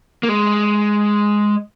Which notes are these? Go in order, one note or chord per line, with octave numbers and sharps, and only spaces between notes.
A#3
G#3